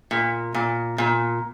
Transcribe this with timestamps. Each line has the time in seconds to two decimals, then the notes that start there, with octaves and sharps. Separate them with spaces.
0.11 A#2
0.54 A#2
0.98 A#2